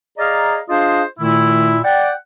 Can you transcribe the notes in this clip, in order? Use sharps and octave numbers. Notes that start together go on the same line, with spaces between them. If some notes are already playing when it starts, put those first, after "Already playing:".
G#4 D5 D#5 F5 A#5
D4 F4 G#4 C5 D#5 F5
A#2 D#3 A3 E4
D5 F#5 G5